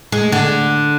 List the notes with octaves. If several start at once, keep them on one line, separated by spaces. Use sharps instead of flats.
G#3
D3